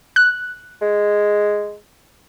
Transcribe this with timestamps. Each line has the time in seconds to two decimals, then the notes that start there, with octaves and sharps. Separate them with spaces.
0.16 F#6
0.81 G#3